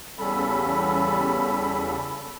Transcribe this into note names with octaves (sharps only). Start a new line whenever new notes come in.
E2 C#3 G3 C#4 A4 B5